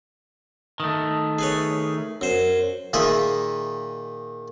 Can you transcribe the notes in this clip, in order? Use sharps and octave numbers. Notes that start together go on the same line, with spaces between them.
D#3 A3
G#4 B4 C#5
F#2 C5
A#2 D#3 G#4 E5